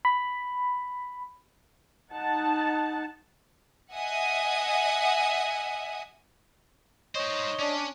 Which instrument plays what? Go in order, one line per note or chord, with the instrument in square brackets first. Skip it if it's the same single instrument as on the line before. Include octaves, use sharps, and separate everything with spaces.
[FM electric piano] B5
[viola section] D#4 F#5 A5
[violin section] D#5 E5 F#5 G#5 D#6
[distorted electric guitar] D#4 C5 [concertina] C#5 D#5
[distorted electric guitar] C#4 [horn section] D4